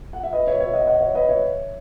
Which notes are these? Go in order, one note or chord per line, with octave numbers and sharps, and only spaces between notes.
F#5
E5
B4 D#5
C#5 E5
C#5 E5
D#5 F#5
D#5 F#5
C#5 E5
B4 D#5
C#5 E5